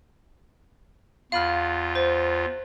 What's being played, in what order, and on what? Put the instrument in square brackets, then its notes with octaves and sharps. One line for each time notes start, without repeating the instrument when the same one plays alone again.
[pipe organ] E2 F4 [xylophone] F5 B5 F6
[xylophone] C5